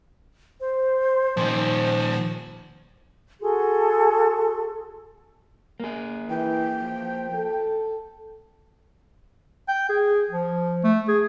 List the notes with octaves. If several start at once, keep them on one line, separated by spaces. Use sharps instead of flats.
C5
A#2 D#3 F3
F#4 G#4 A4 C6
A#3 G#4
E3 G5
F3
A4
G5
G#4
F3
A3
G#4